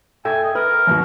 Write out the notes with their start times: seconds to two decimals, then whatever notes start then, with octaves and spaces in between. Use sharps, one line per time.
0.25 A4 E5 G5 G#5
0.44 D#5
0.55 A#4 B4
0.87 G#1 D#2 F#4